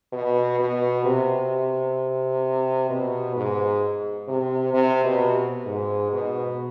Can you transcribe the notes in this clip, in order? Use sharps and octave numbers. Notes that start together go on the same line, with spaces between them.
B2
B2
C3
B2
G#2
C3
C3
B2
G#2
B2